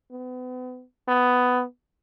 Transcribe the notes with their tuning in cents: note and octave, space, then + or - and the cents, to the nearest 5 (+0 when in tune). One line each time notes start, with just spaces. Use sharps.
B3 +35
B3 +10